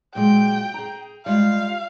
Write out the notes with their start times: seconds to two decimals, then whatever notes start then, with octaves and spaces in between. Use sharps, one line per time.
0.15 A#2 F#3 G#3 G5
0.74 G#4 A#5
1.26 G3 G#3 F4 F5